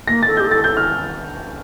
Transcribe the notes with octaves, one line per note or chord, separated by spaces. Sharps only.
A#3 A#6
A4 A6
G4 G6
A4 A6
A4 G6
F6